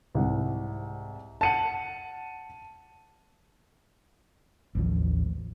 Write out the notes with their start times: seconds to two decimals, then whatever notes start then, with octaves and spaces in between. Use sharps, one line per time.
0.15 C2 G#2 F#5
1.41 F#5 A5 C#7 D#7 F#7
4.75 A1 D#2 F3